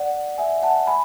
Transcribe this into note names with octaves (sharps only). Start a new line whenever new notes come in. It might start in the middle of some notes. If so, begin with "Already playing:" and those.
Already playing: D5 F#5
E5 G#5
F#5 A5
G#5 B5